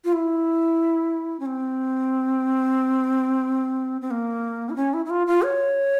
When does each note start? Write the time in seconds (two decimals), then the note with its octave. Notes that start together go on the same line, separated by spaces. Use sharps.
0.05 F4
0.13 E4
1.40 C#4
1.46 C4
4.01 C4
4.11 A#3
4.70 E4
4.76 C#4
4.94 E4
5.06 E4
5.10 F4
5.27 F4
5.43 C#5